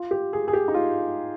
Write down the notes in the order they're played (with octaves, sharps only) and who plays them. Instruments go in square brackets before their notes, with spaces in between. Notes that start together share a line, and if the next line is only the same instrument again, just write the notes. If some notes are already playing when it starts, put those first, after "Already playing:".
Already playing: [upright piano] F4
G4
G#4
G#4
G4
D#4
F4